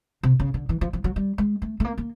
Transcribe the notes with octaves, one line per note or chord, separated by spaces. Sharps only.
C3
C#3
D3
E3
F3
F3
F#3
G3
G#3
A3
A3
A#3
A#3